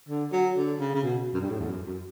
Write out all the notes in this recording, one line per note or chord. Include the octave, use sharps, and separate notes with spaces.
D3
F#3
D3
C#3
C#3
B2
F#2
G2
A2
E2
F#2
F#2